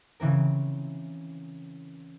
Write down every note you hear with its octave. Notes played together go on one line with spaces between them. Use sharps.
C#3 E3 C4 A#4